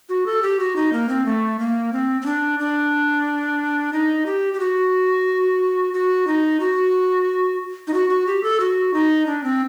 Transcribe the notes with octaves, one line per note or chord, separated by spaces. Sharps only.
F#4
A4
G4
F#4
D#4
A#3
C4
A3
A#3
C4
C4
D4
D4
D#4
G4
G4
F#4
F#4
D#4
F#4
D#4
F#4
F#4
G4
A4
F#4
D#4
D4
C4